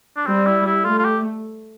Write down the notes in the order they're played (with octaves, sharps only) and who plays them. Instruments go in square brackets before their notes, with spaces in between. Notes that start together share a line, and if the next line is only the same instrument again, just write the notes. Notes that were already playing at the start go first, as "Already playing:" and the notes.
[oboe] D4
[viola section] G3 [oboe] C4
[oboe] E4
E4
[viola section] A3 [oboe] F4
[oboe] F4
G4